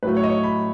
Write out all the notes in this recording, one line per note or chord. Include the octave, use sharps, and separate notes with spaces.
A2 F#3 A3 B4
C#5
D#5
C#5
B5